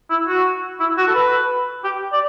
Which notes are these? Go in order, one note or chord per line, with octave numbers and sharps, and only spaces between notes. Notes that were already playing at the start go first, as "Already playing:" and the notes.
E4
F#4
E4
F#4
A4
B4
G4
D5